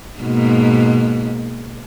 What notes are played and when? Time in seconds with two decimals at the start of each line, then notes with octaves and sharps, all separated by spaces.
0.20 G#2 B2 A#3